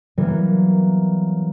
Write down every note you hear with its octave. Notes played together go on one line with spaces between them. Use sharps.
E3 F#3 G3 A#3 B3